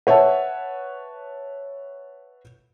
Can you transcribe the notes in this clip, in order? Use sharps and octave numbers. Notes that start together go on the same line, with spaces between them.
B4 C#5 E5 F#5 A5